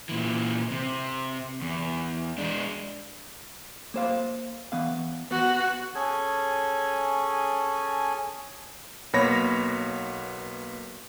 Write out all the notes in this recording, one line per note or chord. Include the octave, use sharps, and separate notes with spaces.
A#2 E3
C3
E2
G#3 D4
A#3 C5 F5
E3 B3 F5
B3 F#4
C#4 G#4 A4 G#5
B1 A#3 B3 C#5 B5 A#6